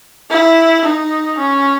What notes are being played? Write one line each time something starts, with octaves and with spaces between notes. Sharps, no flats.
E4
D#4
C#4